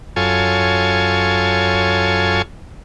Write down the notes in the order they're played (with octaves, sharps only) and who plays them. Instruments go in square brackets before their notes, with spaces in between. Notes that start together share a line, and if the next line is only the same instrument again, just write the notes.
[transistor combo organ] F#2 F4 A4 C#5 G#5